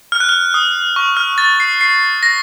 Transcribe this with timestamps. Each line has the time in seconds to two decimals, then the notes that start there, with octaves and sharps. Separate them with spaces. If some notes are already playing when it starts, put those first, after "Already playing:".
0.12 F6
0.20 F#6
0.29 F6
0.54 D#6
0.96 C#6
1.17 F6
1.38 A6
1.60 C7
1.81 C7
2.23 A#6